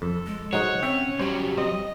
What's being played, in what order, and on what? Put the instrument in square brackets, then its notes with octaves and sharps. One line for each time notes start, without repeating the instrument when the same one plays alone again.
[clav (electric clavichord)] F2 [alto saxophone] A4
[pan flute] G#3
[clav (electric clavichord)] F#3 G#3 D#4 [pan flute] C5 [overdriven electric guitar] C#5 [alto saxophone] F#5
[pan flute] C4 [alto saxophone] C#4 [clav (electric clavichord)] E5 G5
[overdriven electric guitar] G2 F#3 [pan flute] G4 [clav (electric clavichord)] C5 C#5
[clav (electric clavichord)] C4 [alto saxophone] D#5